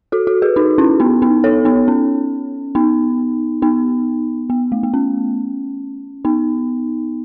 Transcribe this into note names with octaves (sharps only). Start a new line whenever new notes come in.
F#4 A4
F#4 A4
G#4 B4
D#4 F#4
C#4 E4
B3 D#4
B3 D#4
A4 C#5
B3 D#4
C#4
B3 D#4
B3 D#4
B3
A3
B3
C#4
B3 D#4